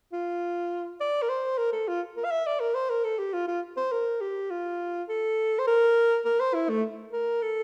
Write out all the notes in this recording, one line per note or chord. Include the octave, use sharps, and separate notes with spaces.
F4
D5
A#4
C5
A#4
A4
F4
A#4
F5
E5
D5
A#4
C5
A#4
A4
G4
F4
F4
C5
A#4
G4
F4
A4
C5
A#4
A#4
C5
E4
A3
A#4
A4